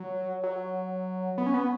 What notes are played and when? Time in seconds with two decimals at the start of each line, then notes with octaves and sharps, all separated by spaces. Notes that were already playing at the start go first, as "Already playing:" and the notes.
Already playing: F#3
0.43 F#3
1.38 B3
1.46 C#4
1.54 B3